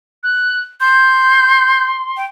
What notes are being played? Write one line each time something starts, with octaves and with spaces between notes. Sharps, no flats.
F#6
C6 G6
G5